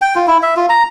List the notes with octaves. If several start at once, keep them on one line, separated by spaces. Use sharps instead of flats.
G5
F4
E4
E5
F4
A#5